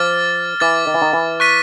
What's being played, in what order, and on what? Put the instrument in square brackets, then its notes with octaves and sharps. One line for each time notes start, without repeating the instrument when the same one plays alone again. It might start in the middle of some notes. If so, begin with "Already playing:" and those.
Already playing: [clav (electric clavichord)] F3 [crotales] D6 F6 A6
[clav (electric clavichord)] E3 [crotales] D6 F6 A6
[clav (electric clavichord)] D#3
E3
D#3
E3
[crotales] C#6 F#6 B6 D#7